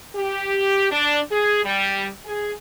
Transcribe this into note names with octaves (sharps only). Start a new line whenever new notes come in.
G4
D4
G#4
G3
G#4